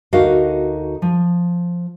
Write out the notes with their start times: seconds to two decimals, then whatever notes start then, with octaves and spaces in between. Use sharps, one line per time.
0.13 D2 D#4 F#4 A#4 D#5 F5
1.02 F3